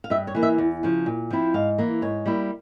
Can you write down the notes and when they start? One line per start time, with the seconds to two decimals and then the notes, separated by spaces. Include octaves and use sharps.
0.04 F5
0.10 G2 E5
0.27 C#5
0.35 E3 A#3
0.43 E5
0.58 E2
0.83 C#3 F3
1.06 A#2
1.30 F3 C4 E4
1.54 G#2 F5
1.78 E3 A#3
2.02 G#2 C#5
2.26 G3 A#3 E4